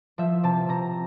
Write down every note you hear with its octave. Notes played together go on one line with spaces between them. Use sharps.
F3 E5
C3 A5
C3 A#5